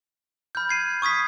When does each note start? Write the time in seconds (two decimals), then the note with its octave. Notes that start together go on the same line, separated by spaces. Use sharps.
0.55 B5 F6 G6
0.69 G#6 C7 D#7
1.02 C#6 D#6 G#6 B6